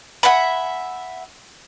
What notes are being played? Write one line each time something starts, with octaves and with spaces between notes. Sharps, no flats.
E5 F#5 G#5 B5